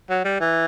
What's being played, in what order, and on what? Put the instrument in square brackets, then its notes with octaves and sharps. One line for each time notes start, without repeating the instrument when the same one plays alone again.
[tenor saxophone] F#3
G3
E3